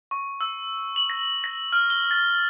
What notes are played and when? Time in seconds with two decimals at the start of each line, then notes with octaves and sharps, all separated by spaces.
0.11 C#6
0.41 E6
0.96 F#7
1.10 A#6
1.44 A#6
1.72 F6
1.90 G7
2.11 A6